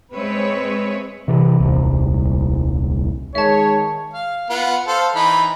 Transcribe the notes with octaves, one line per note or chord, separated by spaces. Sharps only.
G#3 C4 B4 C#5 E5
C3 E3
D#1 C2
D#3 G#3 G#4 C#5 E5 A5
F5
B3 F4
A4 C5 F5
E3 D#4 B5